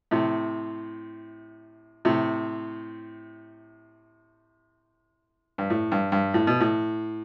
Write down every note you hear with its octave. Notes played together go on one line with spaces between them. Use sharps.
A2 C3
A2 C3
G2
A2
G2
G2
A2
B2
A2